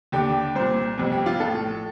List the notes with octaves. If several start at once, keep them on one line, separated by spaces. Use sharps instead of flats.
D#2 D3 G4
C2 A#2 C5
G1 F2 C3
G4
F4
A#1 A2 A4